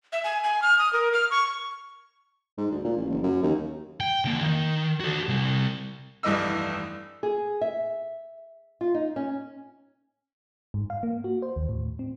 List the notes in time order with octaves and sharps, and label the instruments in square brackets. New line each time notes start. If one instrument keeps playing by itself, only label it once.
[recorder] E5
G#5
G#5
F6
D#6
A#4
F6
C#6
[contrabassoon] G#2
D2
A#2
A1
F#1
F#2
D#2
[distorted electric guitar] G5
D3 A#3
D#3
F#4 A4
C3 G3
[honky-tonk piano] F1 C2 G2 E3 D#5 E6
[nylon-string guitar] G#4
E5
F4
D#4
C#4
[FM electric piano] G#2
F5
A#3
F#4
C5
D#2
A2
C4